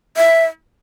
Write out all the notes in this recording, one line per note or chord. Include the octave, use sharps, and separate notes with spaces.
E5